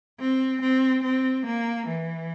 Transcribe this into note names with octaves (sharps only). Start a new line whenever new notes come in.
C4
C4
C4
A#3
E3